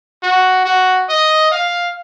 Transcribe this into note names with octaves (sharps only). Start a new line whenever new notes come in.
F#4
F#4
D#5
F5